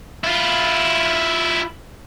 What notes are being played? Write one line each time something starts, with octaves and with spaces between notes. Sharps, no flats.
E4 F4